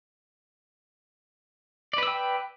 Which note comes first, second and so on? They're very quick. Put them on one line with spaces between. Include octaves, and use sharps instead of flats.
D5 B4 E6 G5